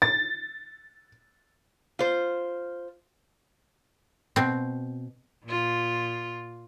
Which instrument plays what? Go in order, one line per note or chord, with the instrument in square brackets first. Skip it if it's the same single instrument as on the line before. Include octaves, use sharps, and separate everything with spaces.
[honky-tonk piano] A6
[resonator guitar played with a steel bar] F4 C5
[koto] B2 C4
[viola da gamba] A#2 F4